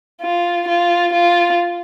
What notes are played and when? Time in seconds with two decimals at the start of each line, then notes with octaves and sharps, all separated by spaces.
0.22 F4
0.68 F4
1.13 F4